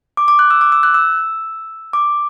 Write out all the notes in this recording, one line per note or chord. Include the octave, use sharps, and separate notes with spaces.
D6
D6
F#6
E6
D6
E6
F#6
E6
D6